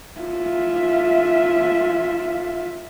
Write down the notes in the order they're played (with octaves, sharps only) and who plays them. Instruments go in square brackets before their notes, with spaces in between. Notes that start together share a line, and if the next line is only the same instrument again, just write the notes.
[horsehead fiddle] F4 E5